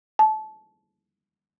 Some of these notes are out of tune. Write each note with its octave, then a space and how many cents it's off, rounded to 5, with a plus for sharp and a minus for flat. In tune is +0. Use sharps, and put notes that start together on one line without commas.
A5 -25